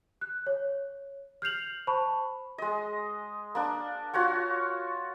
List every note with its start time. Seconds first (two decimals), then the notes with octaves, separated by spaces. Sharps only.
0.21 F#6
0.47 C#5
1.42 F6 G6 C7 F7 F#7
1.87 C5 A5 B5 C#6
2.58 G#3 D#5
3.55 A#3 D4
4.13 F4 F#4 C#5 F#5